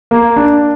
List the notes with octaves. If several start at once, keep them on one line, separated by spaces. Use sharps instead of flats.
A#3
D4